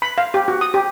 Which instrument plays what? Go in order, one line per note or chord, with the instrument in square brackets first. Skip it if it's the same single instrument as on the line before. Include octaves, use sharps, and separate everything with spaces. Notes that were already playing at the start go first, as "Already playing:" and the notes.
[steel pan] B5
F5
G4
F#4
D#6
G4